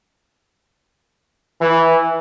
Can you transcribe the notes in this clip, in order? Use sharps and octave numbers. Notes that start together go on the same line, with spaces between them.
E3